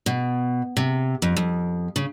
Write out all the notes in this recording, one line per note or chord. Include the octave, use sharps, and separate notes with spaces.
B2
C3
F2
F2
C#3